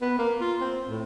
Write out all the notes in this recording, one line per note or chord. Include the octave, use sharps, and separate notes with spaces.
B3
A#3
F4
C4
A2